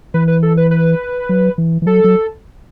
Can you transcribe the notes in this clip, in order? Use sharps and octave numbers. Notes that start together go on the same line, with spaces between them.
E3 B4
B4
A4
B4
B4
F#3
E3
E3
F#3 A4
F#3